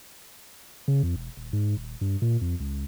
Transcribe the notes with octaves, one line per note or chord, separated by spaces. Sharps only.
C#3
F2
E1
D#1
G#2
D#1
G2
A#2
F2
C#2